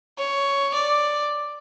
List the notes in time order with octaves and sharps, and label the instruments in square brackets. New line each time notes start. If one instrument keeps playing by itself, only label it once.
[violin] C#5
D5